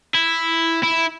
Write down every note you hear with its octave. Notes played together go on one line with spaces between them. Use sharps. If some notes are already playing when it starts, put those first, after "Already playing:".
E4
E4